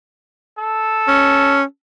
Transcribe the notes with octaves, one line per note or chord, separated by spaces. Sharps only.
A4
C#4